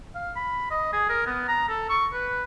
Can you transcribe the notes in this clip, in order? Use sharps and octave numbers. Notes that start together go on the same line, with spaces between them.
F5
B5
D#5
G#4
A#4
B3
A#5
A4
C#6
B4